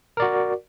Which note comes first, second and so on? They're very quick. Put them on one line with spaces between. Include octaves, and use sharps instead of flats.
A#4 D5 F#4